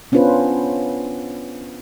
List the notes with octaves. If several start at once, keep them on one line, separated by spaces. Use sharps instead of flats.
B3 C#4 D4 F4 B4 C5